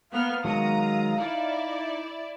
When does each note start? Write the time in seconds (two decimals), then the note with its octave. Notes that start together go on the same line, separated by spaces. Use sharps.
0.12 A#3 B3 F5 F6
0.44 D#3 F#3 G#3 A#5 D#6
1.18 D#4 E4 D5